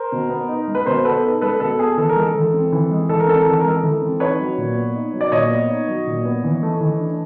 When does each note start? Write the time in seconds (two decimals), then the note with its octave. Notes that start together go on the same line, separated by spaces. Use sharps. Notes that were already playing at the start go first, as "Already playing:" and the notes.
Already playing: A#4 C5
0.12 B2
0.30 B3
0.48 D#4
0.68 G#3
0.75 B4
0.86 B2 A#4 C5
1.04 B3 A4 B4
1.24 D#4
1.41 G#3 A4 B4
1.60 B2 A4
1.79 B3 G#4
1.98 E3 A4
2.09 A#4
2.16 G#3 A4
2.35 E3
2.54 C4
2.72 E3
2.91 G#3
3.09 E3 A4
3.20 A#4
3.28 C4 A4
3.39 A#4
3.46 E3 A4
3.60 G#3 A#4
3.71 A4
3.83 E3
4.02 C4
4.20 D#4 B4 C#5
4.40 F#3
4.58 A#2
4.76 B3
4.95 D#4
5.13 F#3
5.21 D5
5.32 A#2 C#5 D#5
5.50 B3
5.70 D#4
5.88 F#3
6.07 A#2
6.25 B3
6.44 E3
6.63 A3
6.81 E3
7.00 D4